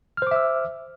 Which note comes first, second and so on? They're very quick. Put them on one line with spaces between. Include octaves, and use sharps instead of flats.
F6 C5 D6 E5 E6